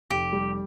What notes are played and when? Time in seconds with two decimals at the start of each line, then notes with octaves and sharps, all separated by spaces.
0.10 F1 G4
0.33 G3